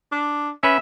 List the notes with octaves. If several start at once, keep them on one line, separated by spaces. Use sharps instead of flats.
D4
C#4 B4 E5